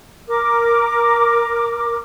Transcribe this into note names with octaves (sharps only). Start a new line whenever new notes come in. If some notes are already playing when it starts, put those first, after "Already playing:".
A#4 D6